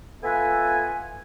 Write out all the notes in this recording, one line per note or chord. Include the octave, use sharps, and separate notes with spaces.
B3 F4 A4 E5 F#5 G#5